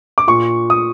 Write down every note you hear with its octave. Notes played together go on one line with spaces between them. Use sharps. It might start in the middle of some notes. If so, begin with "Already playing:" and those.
D6
A#2 C#6
D#6